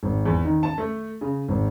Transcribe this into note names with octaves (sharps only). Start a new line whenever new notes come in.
G#1
E2
D#3
A5
A3
C#3
G#1